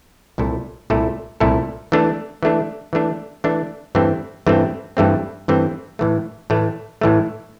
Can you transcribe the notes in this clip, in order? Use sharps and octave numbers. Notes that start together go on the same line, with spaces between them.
C2 A#2 A3 E4 A4
C2 A#2 A3 E4 A4
C2 A#2 A3 E4 A4
E3 A3 D4
E3 A3 D4
E3 A3 D4
E3 A3 D4
G2 E3 A3 C4
G2 E3 A3 C4
G2 E3 A3 C4
G2 E3 A3 C4
A2 E3 A3
A2 E3 A3
A2 E3 A3